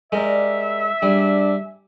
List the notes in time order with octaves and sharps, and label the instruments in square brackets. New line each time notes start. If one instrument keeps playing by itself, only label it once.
[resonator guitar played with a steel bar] G3 A#4 D5 [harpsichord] G#3 [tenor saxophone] E5
[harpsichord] G3 [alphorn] D4 [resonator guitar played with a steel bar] G#4